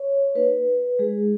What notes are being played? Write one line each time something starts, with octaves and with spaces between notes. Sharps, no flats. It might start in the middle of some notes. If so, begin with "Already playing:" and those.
Already playing: C#5
A#3 D#4 B4
G#3 D#4 G#4